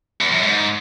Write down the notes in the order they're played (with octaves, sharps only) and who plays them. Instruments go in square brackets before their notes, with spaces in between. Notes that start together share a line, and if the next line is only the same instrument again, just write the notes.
[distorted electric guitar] E2
F#2
G#2